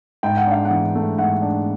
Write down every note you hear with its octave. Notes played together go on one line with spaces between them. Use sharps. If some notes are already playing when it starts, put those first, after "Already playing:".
G#2 G5
F#5
D4 F5
F#5
E3
A3
G#2 F#5
D4